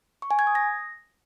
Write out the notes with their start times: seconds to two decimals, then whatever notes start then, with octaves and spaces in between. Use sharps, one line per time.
0.22 C#6
0.31 G#5
0.39 G#6
0.47 D#6
0.55 A#6